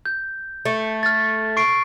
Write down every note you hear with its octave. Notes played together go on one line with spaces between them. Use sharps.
G6
A3
F6 A6
C#6 C7 D7